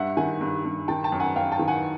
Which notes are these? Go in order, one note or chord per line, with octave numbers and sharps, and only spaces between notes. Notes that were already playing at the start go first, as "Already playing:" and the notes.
Already playing: G2 E5 F#5
D#3 F#5 G#5
G2
G2
D#3 G5 A5
G5 A5
F#2
F#5 G#5
F#2 F5 G5
G5 A5
D#3
F#5 G#5